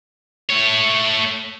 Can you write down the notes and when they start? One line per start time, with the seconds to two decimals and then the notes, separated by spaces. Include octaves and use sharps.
0.49 A3 C#5